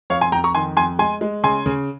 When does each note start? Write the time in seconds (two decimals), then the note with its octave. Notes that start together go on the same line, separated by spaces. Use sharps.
0.10 F2 C#5 F5
0.21 G#5 C6
0.32 F2 G5 A#5
0.44 A#5 C#6
0.54 D#3 G#5 C6
0.77 F2 G#5 C6
0.99 G#3 G#5 C6
1.21 G#3
1.43 C#3 G#5 C6
1.66 C#3